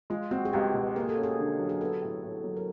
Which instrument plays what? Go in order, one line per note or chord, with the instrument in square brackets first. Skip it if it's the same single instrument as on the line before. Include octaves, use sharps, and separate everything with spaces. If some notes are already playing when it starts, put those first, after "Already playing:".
[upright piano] G#3 [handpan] F4
[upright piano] C4 [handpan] F#4
[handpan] G#4
[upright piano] C#2 [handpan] G4
[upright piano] B2
[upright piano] A#3 [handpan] G#4
[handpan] A4
[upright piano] C#4
[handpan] G#4
[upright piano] D3
F#3
[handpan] G#4
[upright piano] B3 [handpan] A4
[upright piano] A2
A2
F#3
[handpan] A#4